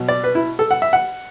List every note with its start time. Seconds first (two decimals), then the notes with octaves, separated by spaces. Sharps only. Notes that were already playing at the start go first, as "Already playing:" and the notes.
Already playing: B2 F#3
0.08 D5
0.24 B4
0.35 E4
0.59 A4
0.71 F#5
0.82 E5
0.93 F#5